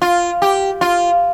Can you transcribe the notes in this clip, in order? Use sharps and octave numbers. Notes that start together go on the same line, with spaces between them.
F4
G4
F4